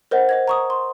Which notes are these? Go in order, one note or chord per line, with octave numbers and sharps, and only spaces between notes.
A#4 C5 D#5 F#5
C5 D#5 G#6
A#5 C#6 D#6
C6